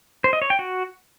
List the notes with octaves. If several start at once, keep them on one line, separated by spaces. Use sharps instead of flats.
C5
D#5
C#5
G5
F#4